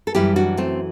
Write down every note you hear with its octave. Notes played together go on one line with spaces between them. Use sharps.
A4
F#2 E3 G3 E4 G4
D4 F#4
A3 C4